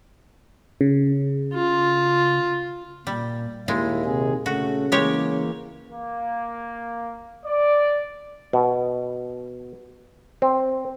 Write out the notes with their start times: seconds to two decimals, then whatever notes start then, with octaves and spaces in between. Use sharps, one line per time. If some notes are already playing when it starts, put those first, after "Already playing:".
0.81 C#3
1.54 F4
3.07 A#2 G3
3.68 D#2 A#2 G#3 E4
4.05 C3 D#3 G#4
4.46 C#3 A3 F#4
4.92 E3 G#3 A#3 G4 C#5
5.88 A#3
7.45 D5
8.53 B2
10.42 C4